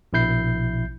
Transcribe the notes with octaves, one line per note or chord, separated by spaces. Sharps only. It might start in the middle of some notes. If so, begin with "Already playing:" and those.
A#1 B2 E4 G6 C7